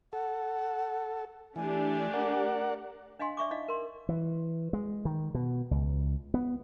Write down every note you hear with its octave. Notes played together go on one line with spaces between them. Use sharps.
A4 F#5
E3 A3 D4 G4 G#5
A#4 D5 F#5
D4 D#5 F5 G#5 C6
D5 E5 C#6 D6
D#4 E4 D5 D#5 F5
A#4 C6
E3
G#3
D#3
B2
C#2
B3